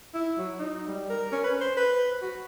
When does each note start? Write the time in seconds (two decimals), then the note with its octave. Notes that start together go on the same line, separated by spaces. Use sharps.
0.14 E4
0.38 F#3
0.59 D#4
0.87 G3
1.09 A#4
1.32 C#4
1.44 B4
1.60 C5
1.77 B4
2.21 F#4